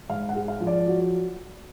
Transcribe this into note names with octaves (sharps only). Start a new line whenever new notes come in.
G#2 F5
F#5
G#3
F5
F3
D5
F#3